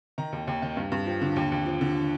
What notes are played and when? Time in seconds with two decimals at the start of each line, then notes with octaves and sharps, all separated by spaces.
0.18 D#3 A#5
0.33 D#2
0.47 D#2
0.62 D#3
0.77 G2
0.92 G2
1.06 F3
1.21 D3
1.36 D#2 G5
1.52 D#2
1.66 F3
1.81 D3